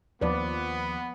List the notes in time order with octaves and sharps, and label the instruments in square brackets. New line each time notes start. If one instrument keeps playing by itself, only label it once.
[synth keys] D#2 F3 [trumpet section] B3 [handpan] B4 D5